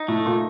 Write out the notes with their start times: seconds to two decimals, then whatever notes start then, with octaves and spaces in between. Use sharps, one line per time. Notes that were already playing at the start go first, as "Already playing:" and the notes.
Already playing: D#4
0.08 A2 A3
0.26 A#2